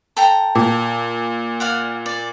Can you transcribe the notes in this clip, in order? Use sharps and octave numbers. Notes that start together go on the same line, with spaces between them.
A4 G5 A#5
A#2
D5 F5 F#5
D5